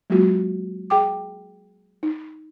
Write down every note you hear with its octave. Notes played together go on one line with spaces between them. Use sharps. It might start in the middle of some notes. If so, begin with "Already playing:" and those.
F#3 G#3 A#3 F4 F#4
G#4 G5 D6
D#4